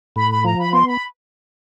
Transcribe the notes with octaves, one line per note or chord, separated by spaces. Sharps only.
A2 B5
B5
F3 A#5
B5
B3 C6
B5